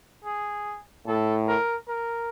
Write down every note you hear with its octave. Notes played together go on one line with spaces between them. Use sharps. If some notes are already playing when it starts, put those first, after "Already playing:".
G#4
A2 A4
A#4
A#4